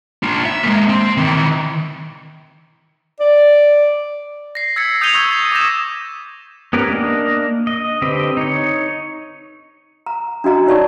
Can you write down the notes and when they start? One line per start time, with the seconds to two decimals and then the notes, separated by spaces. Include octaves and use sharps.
0.23 D4 F4
0.45 E5
0.63 G#3 A#3
0.89 C4
1.17 D#3 E3
3.20 D5
4.55 A#6 C7
4.76 E6 G#6 A6 B6 C#7
5.01 D#6 G6 G#6 D#7 F7 G7
5.14 C#6 E6 G6 G#6
5.31 A6 F7
5.52 D6 D#6 G6 A#6 E7
6.73 B3 C#4 G4 A#4 B4
6.88 A#3 D4 D#5
7.67 D#5
8.02 D3 C4 G4 B4 D#5
8.37 D#4 C#5
10.06 A#5
10.44 D4 F#4 D#5 A#5
10.66 D#4 C#5 D5 A5 C#6